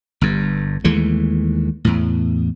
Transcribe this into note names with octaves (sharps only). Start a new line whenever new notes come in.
G1 G2
D#2 E3 G#3 A3
E2 A2